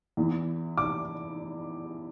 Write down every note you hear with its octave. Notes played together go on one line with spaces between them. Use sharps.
E2 E3
D6